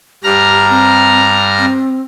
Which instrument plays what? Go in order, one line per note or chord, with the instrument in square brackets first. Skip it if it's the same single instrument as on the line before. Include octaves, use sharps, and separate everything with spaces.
[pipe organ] G2 A#5 F6 [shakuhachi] G4
[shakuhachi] C4
C4